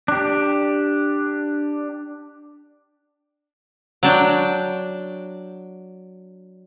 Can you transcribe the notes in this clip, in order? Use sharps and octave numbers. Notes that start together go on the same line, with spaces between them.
D4 G4
F#3 D4 G5